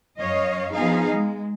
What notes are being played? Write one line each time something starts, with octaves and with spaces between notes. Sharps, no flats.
F#2 C#5 D#5 F5
F3 B3 D#4 G#4 F5
G#3